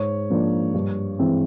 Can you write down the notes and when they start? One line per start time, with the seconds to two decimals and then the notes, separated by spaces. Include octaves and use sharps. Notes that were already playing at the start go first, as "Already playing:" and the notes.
Already playing: G#2 C#5
0.30 F3 A#3 D4
0.74 G2
1.19 E3 G#3 C4